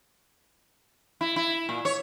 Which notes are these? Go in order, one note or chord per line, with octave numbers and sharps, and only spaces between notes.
E4
E4
A#2
C#5